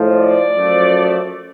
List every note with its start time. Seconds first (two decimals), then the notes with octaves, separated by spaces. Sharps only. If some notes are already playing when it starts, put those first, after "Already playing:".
Already playing: A2 F3 G#3
0.14 D5
0.55 F#2 F3 A3